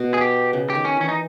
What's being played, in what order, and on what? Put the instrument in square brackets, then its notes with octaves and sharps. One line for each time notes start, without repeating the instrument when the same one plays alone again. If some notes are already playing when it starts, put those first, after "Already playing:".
Already playing: [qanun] B2
[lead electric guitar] G#4
G4
[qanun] C#3
[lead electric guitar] G4
[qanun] D#3
[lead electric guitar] C#4
[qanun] E3 [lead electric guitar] C#4
[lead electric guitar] D#4